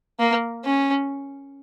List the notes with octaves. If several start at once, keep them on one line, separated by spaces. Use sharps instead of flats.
A#3
C#4